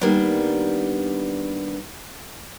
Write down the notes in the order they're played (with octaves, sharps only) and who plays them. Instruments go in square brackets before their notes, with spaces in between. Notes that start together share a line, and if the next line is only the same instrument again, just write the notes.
[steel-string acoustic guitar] D#3 G3 A#3 B3 D4